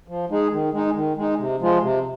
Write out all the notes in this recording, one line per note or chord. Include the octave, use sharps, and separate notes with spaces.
F3
G#3 D#4 G#4
D#3
G#3 D#4
D#3
G#3 D#4
C3
F3 G#3 F4
C3